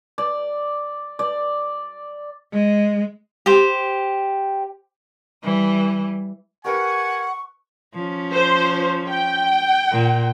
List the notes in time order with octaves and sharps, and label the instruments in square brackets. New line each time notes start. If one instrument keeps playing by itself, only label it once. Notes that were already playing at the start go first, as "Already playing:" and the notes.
[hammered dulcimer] D5
D5
[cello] G#3
[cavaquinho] G4 C5
[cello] E3 G3
[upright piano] G4 A#4 B4 [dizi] F#5 [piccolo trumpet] G#5 [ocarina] C#6
[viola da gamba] F3 C#4
[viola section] C5
G5
[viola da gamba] A#2